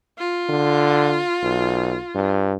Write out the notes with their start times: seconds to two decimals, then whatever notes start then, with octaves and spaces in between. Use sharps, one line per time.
0.18 F4
0.49 D3
1.43 B1
2.15 G2